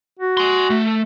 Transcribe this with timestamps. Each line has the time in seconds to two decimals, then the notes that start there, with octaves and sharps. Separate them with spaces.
0.19 F#4
0.37 G#5 C6
0.70 A3